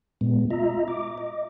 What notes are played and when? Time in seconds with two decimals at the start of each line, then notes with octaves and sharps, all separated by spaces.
0.21 A#2 G#3 B3
0.51 F4 D#5 E5 A#5
0.88 D6
1.18 D#5